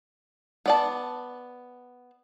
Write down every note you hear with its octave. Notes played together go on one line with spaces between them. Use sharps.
B3 D5 A5